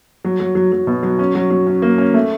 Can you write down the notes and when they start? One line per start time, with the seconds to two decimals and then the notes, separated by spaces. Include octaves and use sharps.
0.25 F#3
0.40 F#3
0.55 F#3
0.72 F#3
0.87 B2
1.03 F#3
1.19 C#4
1.35 F#3
1.50 F#3
1.67 C#4
1.82 A#3
1.98 C#4
2.14 A3